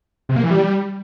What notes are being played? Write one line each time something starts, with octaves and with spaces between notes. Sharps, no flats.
C3
A#3
E3
G3